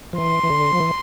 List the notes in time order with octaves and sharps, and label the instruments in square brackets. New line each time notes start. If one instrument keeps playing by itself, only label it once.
[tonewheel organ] F3
[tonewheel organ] E3 [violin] C6
[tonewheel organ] E3
D3
F3
E3